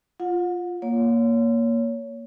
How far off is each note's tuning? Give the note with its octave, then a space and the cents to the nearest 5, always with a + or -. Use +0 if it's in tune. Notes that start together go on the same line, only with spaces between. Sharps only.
F4 +0 F#5 -35
A#3 +5 C#5 +20